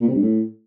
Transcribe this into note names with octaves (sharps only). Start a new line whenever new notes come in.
A#2
C3
G2
A2